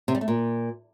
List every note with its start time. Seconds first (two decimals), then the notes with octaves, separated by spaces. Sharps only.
0.08 C3
0.15 G3
0.21 A3
0.28 A#2